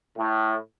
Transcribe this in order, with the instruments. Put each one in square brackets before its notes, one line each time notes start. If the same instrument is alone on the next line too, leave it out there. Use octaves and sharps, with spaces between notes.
[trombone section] A2